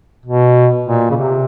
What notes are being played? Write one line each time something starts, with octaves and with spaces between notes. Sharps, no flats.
B2
A#2
C#3
C3